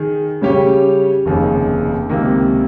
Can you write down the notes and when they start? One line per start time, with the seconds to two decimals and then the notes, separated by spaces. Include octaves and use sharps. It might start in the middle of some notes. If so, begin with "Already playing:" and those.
Already playing: D#3 G#4
0.41 C#3 G3 C#4 G4 C#5
1.26 F1 D#2 C#3
2.09 C#2 C3 D#3 A#3